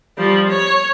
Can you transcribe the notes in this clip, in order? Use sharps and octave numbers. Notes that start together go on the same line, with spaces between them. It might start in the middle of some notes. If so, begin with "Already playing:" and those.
F3 G3
C#5